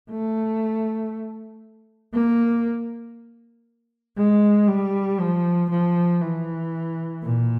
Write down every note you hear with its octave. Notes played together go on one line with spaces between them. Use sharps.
A3
A#3
G#3
G3
F3
F3
E3
A#2